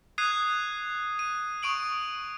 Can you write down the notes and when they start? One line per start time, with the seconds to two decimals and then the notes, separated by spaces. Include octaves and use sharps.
0.18 D#6 F#6 G#6 C7 D#7
1.19 D#7
1.63 C#6 D#6 D7 F#7